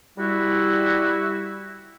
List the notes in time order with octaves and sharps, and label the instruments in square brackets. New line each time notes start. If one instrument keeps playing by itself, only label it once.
[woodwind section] G3 E4 F#4